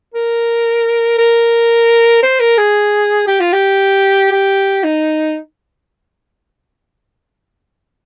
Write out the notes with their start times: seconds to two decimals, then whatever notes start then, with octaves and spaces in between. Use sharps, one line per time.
0.14 A#4
1.18 A#4
2.23 C5
2.40 A#4
2.58 G#4
3.27 G4
3.40 F4
3.53 G4
4.32 G4
4.84 D#4